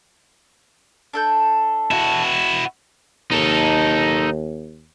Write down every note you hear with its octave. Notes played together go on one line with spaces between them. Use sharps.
D4 A4 G6
E4 F#4
D#2 D#4 A4